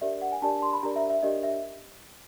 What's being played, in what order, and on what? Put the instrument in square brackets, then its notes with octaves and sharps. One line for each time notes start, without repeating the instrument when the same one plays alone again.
[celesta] D4 G4 A#4 D5 E5
F#5
G#5
D4 G4 A#4 D5 A5
C6
B5
D4 G4 A#4 D5 A#5
E5
E5
D4 G4 A#4 D5 D#5
E5